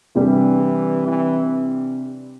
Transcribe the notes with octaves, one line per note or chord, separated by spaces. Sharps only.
C3 E3 G3 D4 G4
E3